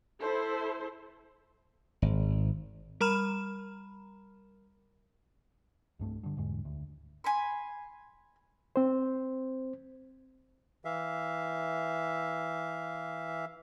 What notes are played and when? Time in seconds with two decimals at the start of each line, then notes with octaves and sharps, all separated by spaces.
0.20 E4 A4 C5
2.02 G#1
3.01 G3 A#4 A#5 B5 F6 E7
5.99 C2 G2 A3 C4
6.23 G2 D3
6.37 E2 G#2 D3 G#3
6.65 D2
7.24 G#5 B5 C6
8.76 C4 C5
10.85 E3 E5 F5